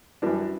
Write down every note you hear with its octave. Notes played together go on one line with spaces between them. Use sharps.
F#2 E3 G3 D4